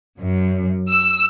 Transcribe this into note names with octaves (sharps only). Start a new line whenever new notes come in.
F#2
E6